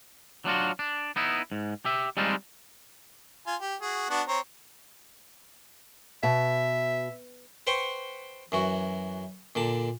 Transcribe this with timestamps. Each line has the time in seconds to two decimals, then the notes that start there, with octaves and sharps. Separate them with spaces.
0.45 F#3 D4 F4 F#4
0.79 D4
1.16 B3 D#4 E4
1.52 G#2
1.85 G4 E5
2.17 G3 G#3 C4 D4 D#4 F4
3.47 F4 G#5
3.61 G4
3.82 F#4 G#4
4.10 B3 D4 F#4
4.28 C4 C#5 A#5
6.23 B2 E5
7.67 B4 C5 F#5 G5 C6 C#6
8.52 F#2 E3 F#4
9.55 A#2 D3 A5